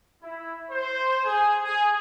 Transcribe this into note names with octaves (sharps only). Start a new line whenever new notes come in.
E4
C5
G#4
G#4